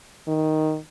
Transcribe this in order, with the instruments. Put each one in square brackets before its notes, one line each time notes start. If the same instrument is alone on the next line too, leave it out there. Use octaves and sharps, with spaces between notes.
[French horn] D#3